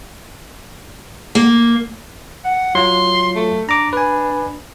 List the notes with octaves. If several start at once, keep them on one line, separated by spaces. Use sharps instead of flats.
A#3
F#5
F#3 F4 C6
A3
D4 A#5 D6
B4 G#5